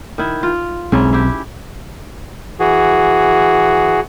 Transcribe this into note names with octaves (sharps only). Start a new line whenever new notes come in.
D#3 E4
F4
B1 G#2 C4 C#4 E4
E4 G4
E3 F#4 G#4